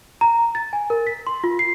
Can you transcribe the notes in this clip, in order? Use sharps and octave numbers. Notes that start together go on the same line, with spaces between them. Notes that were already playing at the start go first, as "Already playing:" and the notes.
A#5
A6
G#5
A#4
B6
C6
F4
C7